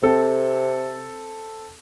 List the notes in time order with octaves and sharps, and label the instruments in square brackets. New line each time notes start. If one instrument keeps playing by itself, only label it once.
[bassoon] C3 [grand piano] C4 A4